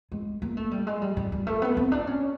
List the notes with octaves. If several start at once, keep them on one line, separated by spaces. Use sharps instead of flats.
G#3
A#3
A3
G3
G#3
G3
G3
G3
A3
B3
C4
D4
C#4